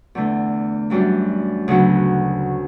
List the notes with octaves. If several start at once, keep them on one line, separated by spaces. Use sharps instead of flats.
E2 D3 A3
F#2 E3 G3 D4
D2 C#3 F#3 B3